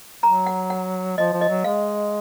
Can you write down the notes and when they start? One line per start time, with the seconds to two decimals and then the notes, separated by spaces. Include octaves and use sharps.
0.23 F#3 A#5
0.47 F#5
0.70 F#5
1.18 F3 D#5
1.33 F3
1.41 D#5
1.49 F#3
1.64 G#3 F5